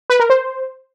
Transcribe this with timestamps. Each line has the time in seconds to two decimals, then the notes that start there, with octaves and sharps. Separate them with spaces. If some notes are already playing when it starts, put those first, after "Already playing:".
0.10 B4
0.20 A#4
0.30 C5